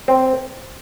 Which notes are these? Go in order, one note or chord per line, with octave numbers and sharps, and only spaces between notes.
C4